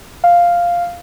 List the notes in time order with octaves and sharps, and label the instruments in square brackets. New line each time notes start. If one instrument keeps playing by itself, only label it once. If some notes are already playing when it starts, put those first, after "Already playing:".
[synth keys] F5